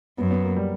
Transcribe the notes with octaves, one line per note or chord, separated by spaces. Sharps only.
F#2 B3
B3
A#3
G3